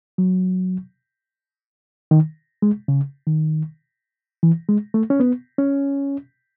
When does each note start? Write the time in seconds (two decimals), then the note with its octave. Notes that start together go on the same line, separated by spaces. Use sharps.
0.18 F#3
2.11 D#3
2.62 G#3
2.88 C#3
3.27 D#3
4.43 E3
4.69 G#3
4.94 A3
5.10 C#4
5.20 B3
5.58 C#4